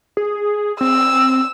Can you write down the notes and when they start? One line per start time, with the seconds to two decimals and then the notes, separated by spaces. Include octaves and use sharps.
0.17 G#4
0.81 C4 E6